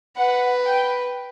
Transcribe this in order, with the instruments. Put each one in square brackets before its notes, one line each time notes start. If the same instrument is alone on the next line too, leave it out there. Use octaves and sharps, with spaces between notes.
[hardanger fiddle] B4 [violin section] F#5
[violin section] G5